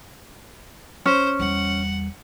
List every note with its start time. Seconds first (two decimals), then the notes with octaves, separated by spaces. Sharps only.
1.06 C#4 C5
1.40 E2 G3 F#5